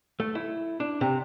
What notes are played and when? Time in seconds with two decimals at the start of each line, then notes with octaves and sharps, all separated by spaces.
0.20 A3
0.35 E4
0.80 D4
1.01 C3